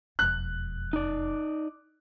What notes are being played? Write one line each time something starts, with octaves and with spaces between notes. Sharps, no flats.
E1 F2 F#6
D#4 D5